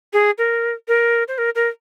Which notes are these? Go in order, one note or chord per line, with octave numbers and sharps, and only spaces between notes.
G#4
A#4
A#4
C5
A#4
A#4